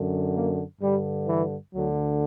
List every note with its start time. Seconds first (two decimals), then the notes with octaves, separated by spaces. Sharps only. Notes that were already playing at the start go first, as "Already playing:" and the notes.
Already playing: F#2 D3
0.35 A#3
0.81 G2 D3 G3
1.27 E3
1.74 D2 D3 F#3